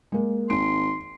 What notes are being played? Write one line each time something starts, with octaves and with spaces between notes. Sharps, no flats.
G#3 A#3
G#1 C6 D7